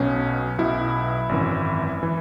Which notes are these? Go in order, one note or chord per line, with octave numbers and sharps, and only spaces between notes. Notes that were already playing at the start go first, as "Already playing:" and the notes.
Already playing: B1 B2 C#4
B1 B2 E4
G#1 F#2 E3
E3